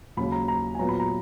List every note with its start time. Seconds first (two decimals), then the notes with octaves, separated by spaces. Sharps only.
0.17 D#2 C#3 F#3 B5
0.32 A#5
0.48 A#5
0.75 G#5
0.79 A#2 F#3 B3 A#5
0.89 B5
1.00 A#5